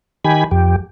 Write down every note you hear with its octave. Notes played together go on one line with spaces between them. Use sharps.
D#3 G4 G#5 B5
F2 G4